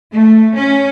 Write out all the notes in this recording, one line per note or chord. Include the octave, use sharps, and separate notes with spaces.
A3
C#4